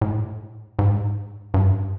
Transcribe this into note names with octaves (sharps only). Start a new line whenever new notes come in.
A2
G#2
G2